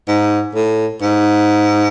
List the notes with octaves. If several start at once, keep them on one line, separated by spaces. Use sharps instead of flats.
G#2
A2
G#2